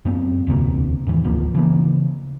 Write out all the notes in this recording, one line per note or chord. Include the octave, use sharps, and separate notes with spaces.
F#2 A#3 C4
E1 D2 C3 A#3
E2 G#2 D#3 E3
F#1 D2 F3 A#3
C#3 E3 A#3